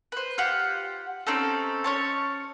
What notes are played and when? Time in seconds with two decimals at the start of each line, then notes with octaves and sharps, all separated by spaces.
0.12 B4 C5
0.38 F4 G4 F#5
1.27 C4 C#4 D#4 A4
1.84 C#4 C#5 A5